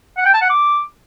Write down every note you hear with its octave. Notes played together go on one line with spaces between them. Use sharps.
F#5
G5
A5
F#5
D6